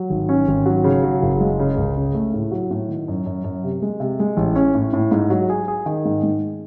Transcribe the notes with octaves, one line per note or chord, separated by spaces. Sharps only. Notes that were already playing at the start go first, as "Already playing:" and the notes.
Already playing: F#3
G#1
C#4
G#1
F#3
C#3
F#3
F#1
G#3
C#3
C#2
C#3
A3
A2
F#3
A2
D#3
F#2
F#2
F#2
C3
G#3
C3
G#3
A1
C#4
A2
A2
G#2
F#3
G#4
G#4
D#3
G#2
G#2